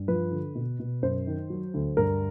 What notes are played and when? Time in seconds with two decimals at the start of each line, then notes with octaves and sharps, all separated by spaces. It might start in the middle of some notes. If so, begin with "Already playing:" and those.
Already playing: G2
0.08 F3 B4
0.31 D3
0.55 B2
0.80 B2
1.03 F#2 C5
1.27 D#3
1.50 F#3
1.74 D2
1.97 G2 A#4